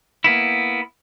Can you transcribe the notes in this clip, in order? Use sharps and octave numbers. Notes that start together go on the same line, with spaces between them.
A#3 B3 E4